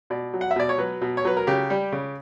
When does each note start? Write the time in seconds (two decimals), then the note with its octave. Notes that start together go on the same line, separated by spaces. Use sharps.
0.10 B2 D5
0.34 F#3
0.41 F#5
0.51 E5
0.56 B2 D5
0.69 C#5
0.78 F#3 B4
1.01 B2
1.17 C#5
1.25 F#3 B4
1.37 A#4
1.47 C#3 G4
1.70 G3
1.92 C#3